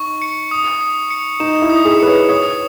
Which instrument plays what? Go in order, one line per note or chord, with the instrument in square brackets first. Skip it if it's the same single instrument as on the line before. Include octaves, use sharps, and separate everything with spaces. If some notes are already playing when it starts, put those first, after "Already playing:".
Already playing: [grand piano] D#4 [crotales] C#6
[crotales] C#7
D#6
D#6
C#7
[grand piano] D#4 [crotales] E7
[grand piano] E4
[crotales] D#6
[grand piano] G#4
[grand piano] B4 [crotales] C#7
[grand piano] C#5
[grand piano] C#5 [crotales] D#6